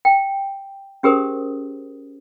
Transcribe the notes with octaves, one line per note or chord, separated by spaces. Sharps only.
G5
C#4 G4 G#4 A#4 C5 D#6